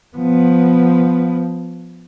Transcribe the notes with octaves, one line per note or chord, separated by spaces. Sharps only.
F3 B3